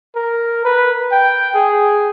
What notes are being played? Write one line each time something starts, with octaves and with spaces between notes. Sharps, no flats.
A#4
B4
G5
G#4